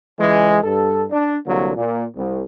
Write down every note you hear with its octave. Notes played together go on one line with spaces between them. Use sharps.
C#2 E3 G#3
G2 A4
D4
C2 D3 F#3 A#3
A#2
C2